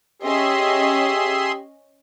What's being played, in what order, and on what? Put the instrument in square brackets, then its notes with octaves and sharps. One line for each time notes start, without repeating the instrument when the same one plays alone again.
[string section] C#4 D#5 [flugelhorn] G4 [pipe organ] G#4 E5 C6